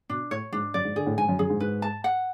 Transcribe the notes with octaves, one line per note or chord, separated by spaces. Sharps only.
B2 D4
A2 C#5
G#2 D4
F#2 D5
G#2
D3 G#4
A2
G#2 G#5
F#2
F#2 G#4
G#2
G#2 B4
A5
F#5